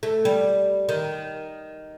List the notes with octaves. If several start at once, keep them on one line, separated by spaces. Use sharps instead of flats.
A3
G3
D#3